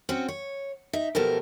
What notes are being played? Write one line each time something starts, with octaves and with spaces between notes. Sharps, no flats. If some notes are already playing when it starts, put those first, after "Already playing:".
C4 C#4 F#4
C#5
D#4 E5
B2 F3 A3 G4 A4 A#4